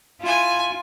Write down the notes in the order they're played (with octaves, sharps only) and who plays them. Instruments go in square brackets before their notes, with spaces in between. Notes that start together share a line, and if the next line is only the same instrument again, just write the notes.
[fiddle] E4 G#5 [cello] F4